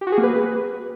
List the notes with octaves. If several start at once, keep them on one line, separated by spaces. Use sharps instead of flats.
G4
F#4
G#4
A#3
B4